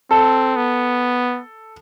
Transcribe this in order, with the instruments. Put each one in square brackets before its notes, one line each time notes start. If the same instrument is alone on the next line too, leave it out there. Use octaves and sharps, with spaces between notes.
[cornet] C4 [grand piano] A4
[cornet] B3